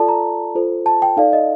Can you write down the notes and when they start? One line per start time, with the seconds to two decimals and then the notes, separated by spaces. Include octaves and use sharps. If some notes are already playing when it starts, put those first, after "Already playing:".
Already playing: F4 A4 D5 A5
0.08 A#5
0.55 F4 A4 C5
0.86 A5
1.02 G5
1.17 D#4 A4 D5 F5
1.33 D#5